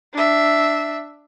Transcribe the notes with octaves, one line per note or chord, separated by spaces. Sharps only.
D4 E5